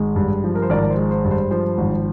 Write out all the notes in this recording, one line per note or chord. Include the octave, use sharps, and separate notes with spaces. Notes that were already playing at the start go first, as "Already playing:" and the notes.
Already playing: G#1 G#3
G2
F3
A#4
C5
G#1 A#4 D5
C5
G#3
C5
G2
C5
F3 C5
G#1